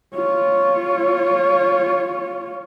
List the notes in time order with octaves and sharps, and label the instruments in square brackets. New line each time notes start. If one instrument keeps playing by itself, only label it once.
[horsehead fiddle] F4 C#5